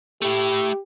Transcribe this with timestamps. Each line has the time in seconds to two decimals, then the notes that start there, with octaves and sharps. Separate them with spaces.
0.22 A3 E4 G4